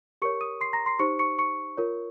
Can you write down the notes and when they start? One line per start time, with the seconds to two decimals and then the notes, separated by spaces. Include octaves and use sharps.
0.22 G4 A#4 C#5 C#6 C#7
0.41 D#6 D#7
0.61 C6 C7
0.73 A#5 A#6
0.86 C6 C7
0.99 D#4 G4 C5 C#6 C#7
1.19 C#6 C#7
1.39 C#6 C#7
1.77 F4 A#4 C#5